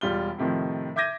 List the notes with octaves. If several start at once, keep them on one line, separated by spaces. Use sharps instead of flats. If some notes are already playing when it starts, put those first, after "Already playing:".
E1 G3 F4 G7
A2 C3 D#3 F3
E5 D6 G6 G#6 A#6 D#7